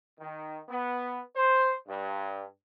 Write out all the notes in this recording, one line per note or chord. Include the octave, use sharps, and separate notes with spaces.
D#3
B3
C5
G2